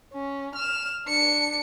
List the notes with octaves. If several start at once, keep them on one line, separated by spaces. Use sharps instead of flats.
C#4
F6 E7
D4 C#7